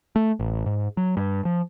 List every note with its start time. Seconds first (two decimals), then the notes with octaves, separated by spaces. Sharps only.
0.16 A3
0.40 A1
0.66 G#2
0.97 F#3
1.17 G2
1.45 F3